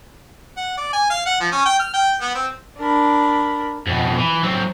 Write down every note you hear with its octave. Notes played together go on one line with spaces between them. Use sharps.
F#5
D5
G#5
F5
F#5
F3
C#4
G5
F6
G5
B3
C4
D4 A#4 B5
F2 B2
E3
F#3 C4